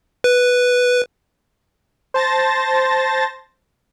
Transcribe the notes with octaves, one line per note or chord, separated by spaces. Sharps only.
B4
C5 A5 A6 A#6